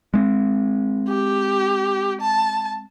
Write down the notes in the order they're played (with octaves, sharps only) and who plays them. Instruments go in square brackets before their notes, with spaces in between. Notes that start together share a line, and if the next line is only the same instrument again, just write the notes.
[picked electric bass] G#3 B3 C4
[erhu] G4
A5